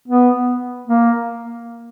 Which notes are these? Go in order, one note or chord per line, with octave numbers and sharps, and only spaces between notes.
B3
A#3